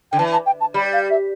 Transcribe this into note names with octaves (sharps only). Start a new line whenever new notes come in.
D3 G5
E3 A5
A5
G5
A5
G3 B5
F5
E5